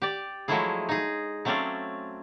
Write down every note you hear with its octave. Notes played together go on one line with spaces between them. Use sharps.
G4 D5
F3 F#3 G#3 A3 E4 G#4
D#4 G#4
F#3 A3 C4 C#4 D5 F5